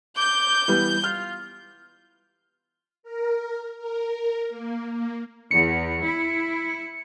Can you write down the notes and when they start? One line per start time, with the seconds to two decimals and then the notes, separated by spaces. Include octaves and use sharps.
0.17 D6 G6
0.68 E3 G3 B3
1.04 F4 F6
3.03 A#4
3.78 A#4
4.49 A#3
4.91 A#3
5.51 E2 C#7
6.04 E4